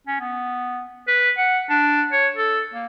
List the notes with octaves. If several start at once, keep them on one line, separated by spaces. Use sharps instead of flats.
C#4
B3
B4
F#5
D4
C#5
A4
A#3